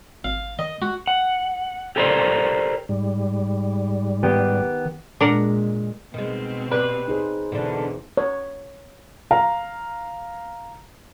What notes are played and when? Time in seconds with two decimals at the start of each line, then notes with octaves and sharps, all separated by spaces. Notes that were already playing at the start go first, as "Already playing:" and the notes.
0.24 G#1 F5
0.59 D#3 D#5
0.82 G#3 F#4
1.07 F#5
1.96 G4 A4 A#4 C5 D5
2.89 G#2 G3
4.23 D#3 B3 G4
5.21 A#2 G#3 D4 A#4 F#5
6.14 B2 D#3 G#3 C4
6.71 G4 B4 D5
7.08 D#4 G#4 C5
7.52 E2 B2 D3 D4
8.17 C#5
9.31 F5 A#5